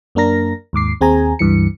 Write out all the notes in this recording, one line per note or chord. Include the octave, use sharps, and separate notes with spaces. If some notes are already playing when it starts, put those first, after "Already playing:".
F#2 A#3 D4 A#4 A#6
D#2 G#2 D6 C7
D#2 C4 G#4 G#5 A#5
C#2 G2 E3 C#7